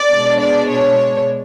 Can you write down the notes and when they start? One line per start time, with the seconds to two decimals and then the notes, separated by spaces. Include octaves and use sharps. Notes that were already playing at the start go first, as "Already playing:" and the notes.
Already playing: D5
0.11 B2 G#3 D4
0.40 D5
0.69 C#5